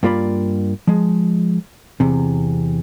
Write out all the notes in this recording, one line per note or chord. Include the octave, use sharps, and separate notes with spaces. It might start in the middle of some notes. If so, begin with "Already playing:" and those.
G2 A#3 F4 D5 B5
F3 G#3
E2 C3